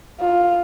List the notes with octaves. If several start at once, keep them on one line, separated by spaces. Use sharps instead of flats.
F4